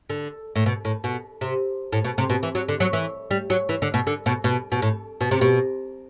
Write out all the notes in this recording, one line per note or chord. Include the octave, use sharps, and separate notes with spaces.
D3
A2
B2
A2
B2
C3
A2
B2
C3
B2
E3
F#3
D3
F#3
E3
G3
F#3
E3
D3
B2
D3
B2
B2
B2
A2
B2
C3
B2